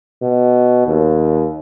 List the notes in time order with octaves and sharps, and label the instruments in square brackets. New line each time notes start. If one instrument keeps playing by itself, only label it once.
[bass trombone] B2
D#2